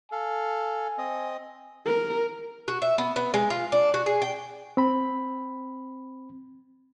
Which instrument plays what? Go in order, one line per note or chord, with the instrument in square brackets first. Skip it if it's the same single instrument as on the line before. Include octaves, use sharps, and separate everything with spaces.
[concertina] A4 F5 [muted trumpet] G#5
[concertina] C4 D#5
[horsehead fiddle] A#4
[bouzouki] F#4
E5
B3
B3
G#3
F4
D4
F#4
G#4
G5
[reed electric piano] C4 B5